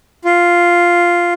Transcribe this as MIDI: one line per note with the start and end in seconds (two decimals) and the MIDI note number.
0.25 1.34 65